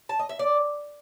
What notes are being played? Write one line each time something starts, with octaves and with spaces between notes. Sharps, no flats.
A5
D#5
E5
D5